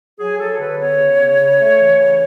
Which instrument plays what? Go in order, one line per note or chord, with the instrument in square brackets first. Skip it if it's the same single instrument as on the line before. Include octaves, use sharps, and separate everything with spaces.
[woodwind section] F#3 G#4
F#3 A4
D3 B4
B3 C#5
C#3
C#3
C#3
A3
E3
C#3